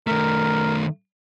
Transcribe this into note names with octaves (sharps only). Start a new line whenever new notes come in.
D#3 A3 A#4